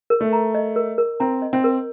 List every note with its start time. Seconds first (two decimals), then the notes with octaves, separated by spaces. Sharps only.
0.10 A#4
0.21 A3
0.33 A#5
0.55 D#5
0.76 A#4
0.98 A#4
1.20 C4 A#5
1.42 D#5
1.53 C4
1.64 A#4